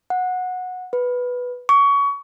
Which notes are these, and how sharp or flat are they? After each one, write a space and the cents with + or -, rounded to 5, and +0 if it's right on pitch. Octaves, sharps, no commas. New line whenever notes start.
F#5 -15
B4 +0
C#6 +25